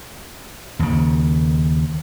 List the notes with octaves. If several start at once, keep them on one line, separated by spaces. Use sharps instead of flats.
D#2 C#3